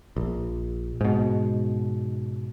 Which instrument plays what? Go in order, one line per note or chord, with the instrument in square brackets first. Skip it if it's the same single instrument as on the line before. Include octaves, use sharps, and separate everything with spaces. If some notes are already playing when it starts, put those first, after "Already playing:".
[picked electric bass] A#1
G#2 B2